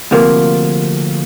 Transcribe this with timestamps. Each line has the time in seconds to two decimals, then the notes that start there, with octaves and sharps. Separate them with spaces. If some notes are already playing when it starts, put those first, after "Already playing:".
0.11 D2 C3 F3 A#3